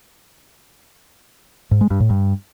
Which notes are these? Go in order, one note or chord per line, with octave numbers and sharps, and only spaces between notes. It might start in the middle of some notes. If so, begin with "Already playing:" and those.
G#2
G#3
G2
A2
G2